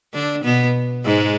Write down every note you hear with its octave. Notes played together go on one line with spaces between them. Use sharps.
D3 D4
B2 B3
G#2 G#3